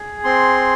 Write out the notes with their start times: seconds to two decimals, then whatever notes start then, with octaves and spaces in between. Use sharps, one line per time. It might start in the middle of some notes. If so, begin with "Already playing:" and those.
Already playing: G#4
0.24 C4 C6